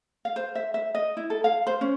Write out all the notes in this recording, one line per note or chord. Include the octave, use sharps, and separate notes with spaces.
F5
C5
E5
E5
D#5
E4
A4
F5
C5
C#4